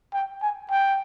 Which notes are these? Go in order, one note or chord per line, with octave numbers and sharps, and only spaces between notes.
G5
G#5
G5